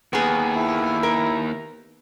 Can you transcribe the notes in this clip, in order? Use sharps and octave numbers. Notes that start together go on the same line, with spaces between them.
D#2 B3 G#4
E4
A#4